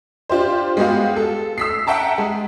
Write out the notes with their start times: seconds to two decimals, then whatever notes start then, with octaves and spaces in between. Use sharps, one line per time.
0.29 D4 F4 G4 C5
0.77 G#3 B3 F#4 G4 F5
1.16 A4
1.58 E6 B6 C7
1.87 E5 F#5 G5 A5 A#5
2.18 G#3